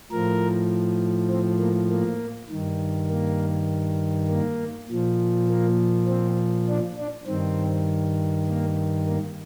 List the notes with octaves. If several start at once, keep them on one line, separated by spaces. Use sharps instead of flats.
A2 F3 A#4
C4
A#3
A#3
G2 D#3
A#3
A#3
A#2 F3
A#3
C4
D4
D4
G2 D#3 C4
A#3
A#3